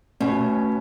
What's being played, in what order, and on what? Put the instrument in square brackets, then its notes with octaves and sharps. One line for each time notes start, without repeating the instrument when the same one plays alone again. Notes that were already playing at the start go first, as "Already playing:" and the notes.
[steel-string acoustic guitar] B2 [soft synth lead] A3 [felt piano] C#4